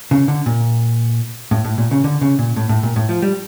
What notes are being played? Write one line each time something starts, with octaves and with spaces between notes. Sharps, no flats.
C#3
D3
A#2
A2
A2
A#2
C#3
D3
C#3
A#2
A2
A2
A#2
A2
F3
G3